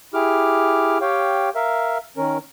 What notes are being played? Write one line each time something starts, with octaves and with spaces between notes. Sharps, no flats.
E4 G4 G#4 D6 F6
G4 C#5 F5 G5
A#4 E5 F5
D#3 C#4 A#4